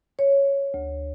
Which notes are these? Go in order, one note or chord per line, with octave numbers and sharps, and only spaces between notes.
C#5
D2